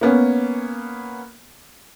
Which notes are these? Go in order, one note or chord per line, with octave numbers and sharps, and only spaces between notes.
A#3 B3 C#4